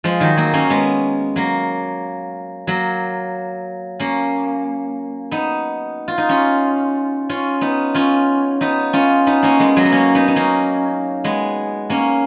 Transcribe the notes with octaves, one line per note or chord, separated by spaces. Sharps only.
F3 G#3
D#3 F#3
F#3 A#3
A#3 C#4
G#3 B3
F#3 A#3
F#3 A#3
A#3 C#4
B3 D#4
F4
D#4
C#4 F4
C#4 F4
B3 D#4
C#4 F4
B3 D#4
C#4 F4
B3 D#4
A#3 C#4
G#3 B3
F#3 A#3
B3
A#3 C#4
B3 D#4
D#4
A#3 C#4
G#3 B3
A#3 C#4